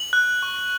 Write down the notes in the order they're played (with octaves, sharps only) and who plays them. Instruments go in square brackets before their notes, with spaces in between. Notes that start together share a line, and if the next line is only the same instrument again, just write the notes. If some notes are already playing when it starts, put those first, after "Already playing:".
Already playing: [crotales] F#7
F#6
C#6